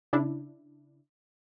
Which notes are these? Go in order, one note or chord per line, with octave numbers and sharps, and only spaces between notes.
C#3 D4 E4